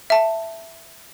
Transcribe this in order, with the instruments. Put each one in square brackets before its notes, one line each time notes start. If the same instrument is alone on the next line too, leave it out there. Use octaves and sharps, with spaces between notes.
[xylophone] E5 A5